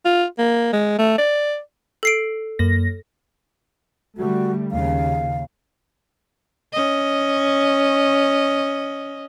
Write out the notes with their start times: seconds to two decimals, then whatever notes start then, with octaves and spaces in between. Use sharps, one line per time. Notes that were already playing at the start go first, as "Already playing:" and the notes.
0.05 F4
0.39 A#3
0.73 G#3
0.99 A3
1.18 D5
2.03 A4 C7 D7
2.59 F#2 A#3 A#6
4.17 D3 G3 A3 F#4
4.71 D#2 C#3 F5
6.73 C#4 D#5